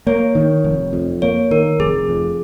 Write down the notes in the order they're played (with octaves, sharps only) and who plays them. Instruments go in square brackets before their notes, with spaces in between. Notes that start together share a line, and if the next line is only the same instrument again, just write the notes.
[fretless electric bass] A#3 [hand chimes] C#5
[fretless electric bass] D#3
F1
F2
[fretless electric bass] A#3 [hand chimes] C#5
[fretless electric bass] D#3 [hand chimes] A#4
[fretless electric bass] F1 [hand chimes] G#4
[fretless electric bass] F2